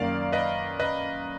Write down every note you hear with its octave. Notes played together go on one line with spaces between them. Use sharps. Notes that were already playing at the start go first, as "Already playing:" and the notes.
Already playing: F#2 D#3 A#3 D5 F5
B4 D#5
B4 D#5